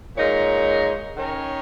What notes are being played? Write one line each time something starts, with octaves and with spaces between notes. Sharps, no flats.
A#2 G#3 D#4 A#4 C#5
D#3 C#4 A#4 C#5